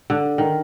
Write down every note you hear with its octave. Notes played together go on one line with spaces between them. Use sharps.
D3
D#3